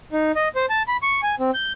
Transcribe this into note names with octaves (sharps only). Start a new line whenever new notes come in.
D#4
D#5
C5
A5
B5
C#6
G#5
C4
G6